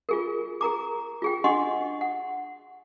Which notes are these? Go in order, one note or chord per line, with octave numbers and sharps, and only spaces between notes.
F4 G#4 A#4
G#4 A#4 A#5 D6
F4 G#4 G5
D4 D#5 F#5 C6 C#6
F#5